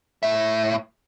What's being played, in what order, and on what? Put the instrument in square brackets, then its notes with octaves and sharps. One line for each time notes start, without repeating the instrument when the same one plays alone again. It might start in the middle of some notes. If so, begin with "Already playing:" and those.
[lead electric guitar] A2 E5